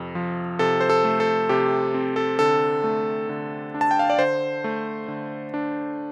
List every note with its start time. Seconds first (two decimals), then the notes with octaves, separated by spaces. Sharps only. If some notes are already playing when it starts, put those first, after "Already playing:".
Already playing: F2 C3
0.15 F3
0.59 C3 A4
0.81 C5
0.90 A4
1.04 A3
1.20 A4
1.49 C3 G4
1.94 C4
2.16 A4
2.39 D3 A4
2.84 A3
3.29 D3
3.74 D4
3.81 A5
3.91 G5
3.99 F5
4.10 D5
4.19 D3 C5
4.64 A3
5.08 D3
5.54 D4